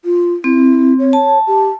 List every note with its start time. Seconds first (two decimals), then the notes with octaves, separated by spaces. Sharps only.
0.05 F4
0.44 C4 E4
0.99 C#5
1.13 A5
1.47 G4